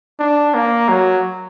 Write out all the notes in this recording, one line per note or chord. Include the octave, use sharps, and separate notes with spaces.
D4
A#3
F#3